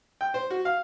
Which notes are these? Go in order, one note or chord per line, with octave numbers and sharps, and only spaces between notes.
G5
C5
F#4
F5